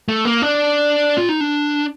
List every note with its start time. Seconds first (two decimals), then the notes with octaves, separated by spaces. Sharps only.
0.08 A3
0.25 A#3
0.42 D4
1.18 F4
1.29 D#4
1.41 D4